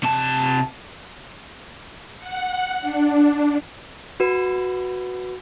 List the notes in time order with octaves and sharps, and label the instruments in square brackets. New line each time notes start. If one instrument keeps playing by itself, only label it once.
[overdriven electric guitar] C3 A5
[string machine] F#5
D4
[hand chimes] F#4 B4